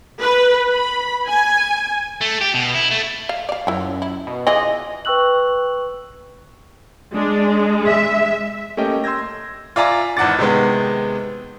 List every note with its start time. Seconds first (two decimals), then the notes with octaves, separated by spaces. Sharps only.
0.21 B4
0.71 B5
1.27 G#5
2.21 A3
2.41 G4
2.54 B2
2.74 E4
2.90 A3
3.29 F5
3.49 D5 F5
3.67 F#2 F3 E4
4.02 E4
4.27 B2
4.47 E3 F4 G#4 D#5
5.05 B4 G5 C#6 E6 F#6 F#7
7.14 G#3 D4
7.87 E5
8.77 A3 A#3 C#4 G4 D#5 G5
9.04 C6 E6 G6 G#6 A#6
9.76 F4 D5 E5 G#5 A#5
10.17 G#1 E2 F#5 D6 A6
10.39 C3 D#3 G#3 B3